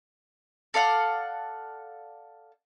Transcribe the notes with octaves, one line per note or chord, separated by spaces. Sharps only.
A4 D5 F5 F#5